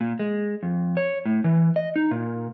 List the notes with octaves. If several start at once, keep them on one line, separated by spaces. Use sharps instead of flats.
A#2
G#3
F2
C#5
A2
E3
D#5
D#4
A#2